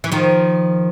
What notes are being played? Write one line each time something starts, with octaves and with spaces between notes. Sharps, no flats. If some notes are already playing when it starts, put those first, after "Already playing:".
E3
D#3 F3